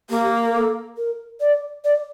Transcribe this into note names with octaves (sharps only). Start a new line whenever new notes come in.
A#3 G4
A#4
A4
A#4
D5
D5